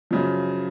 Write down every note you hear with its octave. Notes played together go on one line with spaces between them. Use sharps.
F#2 C#3 F3